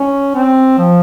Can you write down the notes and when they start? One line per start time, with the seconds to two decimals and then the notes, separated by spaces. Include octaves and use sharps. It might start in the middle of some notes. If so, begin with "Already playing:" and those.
Already playing: C#4
0.35 C4
0.78 F3